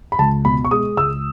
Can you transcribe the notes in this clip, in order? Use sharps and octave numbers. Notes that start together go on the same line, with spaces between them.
B5
C#2 A5
B2 B5
C#6
G#3 D#6
C#2 E6